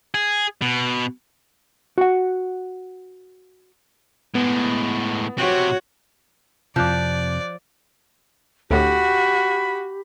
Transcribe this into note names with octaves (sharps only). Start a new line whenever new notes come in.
G#4
B2
F#4 F#5
A2 G#3 B3
C3 C4 F#4 C#5
F2 C3 F3 D5 D6 F#6 G6
D2 A2 F#4 G4 B5